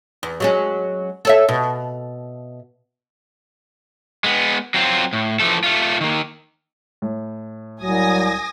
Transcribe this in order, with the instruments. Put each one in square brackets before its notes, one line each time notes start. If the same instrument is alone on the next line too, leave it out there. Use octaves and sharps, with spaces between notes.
[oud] E2
F#3 G#3 C#4
A4 C#5 E5
B2
[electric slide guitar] G#3 B3
F#3 C4 F4
A2
E3 F3 A3 A4
A3 F4
D#3 A#3
[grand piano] A2
[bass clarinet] C2 [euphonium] F#3 [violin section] G#5 D#6 A#6